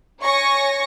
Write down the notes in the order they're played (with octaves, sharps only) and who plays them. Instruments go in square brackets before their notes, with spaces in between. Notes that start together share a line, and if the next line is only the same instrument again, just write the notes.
[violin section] C#5 G#5 C#6 A#6